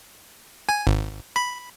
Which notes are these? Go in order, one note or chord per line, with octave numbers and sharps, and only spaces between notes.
G#5
G#1
B5